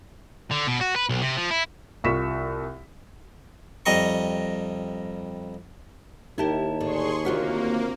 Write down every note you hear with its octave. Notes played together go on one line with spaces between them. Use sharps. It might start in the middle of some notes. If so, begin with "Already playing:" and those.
D3
B2
F#4
B4
B1
C3
F3
E4
C2 F4 C#6 B6 E7
F2 G3 D#5 A#5 C#6
D#2 D#4 E4 G4 A#4 A5
A2 D3 G#4 C6 C#6
D2 C3 A#3 F4 F#4 A#4 F#5